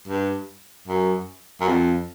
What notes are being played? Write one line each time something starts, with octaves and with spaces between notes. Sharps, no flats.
G2
F#2
F#2
F2